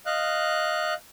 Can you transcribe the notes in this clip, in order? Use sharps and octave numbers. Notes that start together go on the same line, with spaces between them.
D#5 F5 F#6